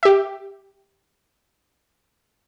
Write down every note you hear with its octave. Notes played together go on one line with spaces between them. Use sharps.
G4 E5